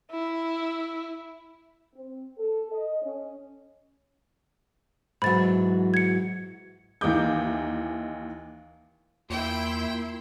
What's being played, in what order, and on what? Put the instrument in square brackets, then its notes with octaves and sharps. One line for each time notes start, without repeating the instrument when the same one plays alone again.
[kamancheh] E4
[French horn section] C4
A4
D#5
C#4
[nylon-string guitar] G#2 E3 F#3 [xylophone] B5 A6
[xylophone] G#6 C#7
[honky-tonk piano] D#2 E3 D#4 D6 G6
[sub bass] E2 [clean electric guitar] A#2 [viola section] E4 C6 [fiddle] G5